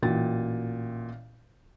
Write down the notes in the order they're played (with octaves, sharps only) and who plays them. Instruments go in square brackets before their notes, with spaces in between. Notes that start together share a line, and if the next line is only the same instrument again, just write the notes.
[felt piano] A1 A#2 F#4 G5 A6